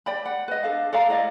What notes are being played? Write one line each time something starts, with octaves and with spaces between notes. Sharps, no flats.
D5 G5 B5
F#5
B4 D#5
D4 A4 F5
A4 D5 F5 A#5
E4 D5 D#5 F5